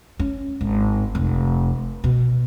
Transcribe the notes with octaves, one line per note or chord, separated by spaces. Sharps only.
C#4
G#1
F1
B2